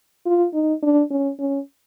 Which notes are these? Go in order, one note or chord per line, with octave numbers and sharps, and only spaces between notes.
F4
D#4
D4
C#4
C#4